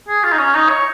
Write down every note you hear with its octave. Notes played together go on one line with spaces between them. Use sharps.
G#4
F4
D#4
C#4
D#4
C#5